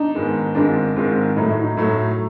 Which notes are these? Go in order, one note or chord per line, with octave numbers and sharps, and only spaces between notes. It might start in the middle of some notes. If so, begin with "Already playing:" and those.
Already playing: D4 D#4
G#2 D#3 G#3 B3
G#2 D#3 G#3 C4 D4 F4
G#2 D#3 G#3 C4 F4
A2 F#3 A3 D#4
E4
D#4
A2 F#3 A3